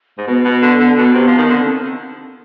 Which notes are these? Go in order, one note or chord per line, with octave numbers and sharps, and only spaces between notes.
G#2
B2 B3
B2
D3
D3
B2
C3
F3
D#3
D3
C4